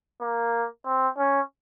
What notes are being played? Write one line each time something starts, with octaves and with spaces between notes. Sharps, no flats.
A#3
C4
C#4